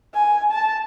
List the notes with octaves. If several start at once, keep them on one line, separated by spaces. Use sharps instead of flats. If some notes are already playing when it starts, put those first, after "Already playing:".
G#5
A5